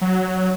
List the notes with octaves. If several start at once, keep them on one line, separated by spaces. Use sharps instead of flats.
F#3